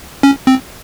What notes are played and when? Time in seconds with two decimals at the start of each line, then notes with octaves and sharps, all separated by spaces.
0.23 C#4
0.47 C4